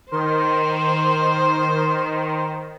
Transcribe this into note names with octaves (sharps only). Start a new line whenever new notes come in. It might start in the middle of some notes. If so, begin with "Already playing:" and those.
D#3 C5 C6